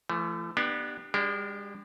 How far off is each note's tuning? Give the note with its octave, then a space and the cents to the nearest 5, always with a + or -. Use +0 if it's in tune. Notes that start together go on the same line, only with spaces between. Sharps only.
E3 +45 A3 +0
B3 -20 D4 +25 G4 -5
G#3 -45 D4 +0 G4 -25